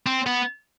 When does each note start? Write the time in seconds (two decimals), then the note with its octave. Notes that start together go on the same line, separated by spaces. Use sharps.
0.06 C4
0.26 B3